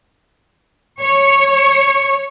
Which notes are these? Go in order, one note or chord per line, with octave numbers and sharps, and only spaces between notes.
C#5